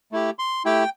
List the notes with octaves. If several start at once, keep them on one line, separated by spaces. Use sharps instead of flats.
A3 E4 G4
C6
A3 E4 G4 G5